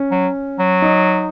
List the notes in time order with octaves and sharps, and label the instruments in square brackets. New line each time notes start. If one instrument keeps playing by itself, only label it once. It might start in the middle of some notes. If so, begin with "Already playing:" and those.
Already playing: [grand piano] C#4
[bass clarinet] F#3
F#3
[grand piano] D#4